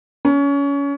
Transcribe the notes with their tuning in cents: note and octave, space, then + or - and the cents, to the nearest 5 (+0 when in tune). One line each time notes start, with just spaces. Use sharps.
C#4 +25